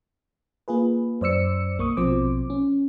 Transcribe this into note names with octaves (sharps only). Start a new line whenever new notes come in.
A#3 F4 G#4 B4
F#2 C5 D5 E6 C#7
B1 A#3 C#6 D#6
A#1 B2 F3 C4 C5 D6
C#4